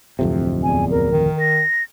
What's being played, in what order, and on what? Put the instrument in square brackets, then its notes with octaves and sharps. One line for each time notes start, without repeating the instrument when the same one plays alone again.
[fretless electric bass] D1 F2 C3
[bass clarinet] E2 [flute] G#5
[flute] A#4
[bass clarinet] D#3
[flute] A#6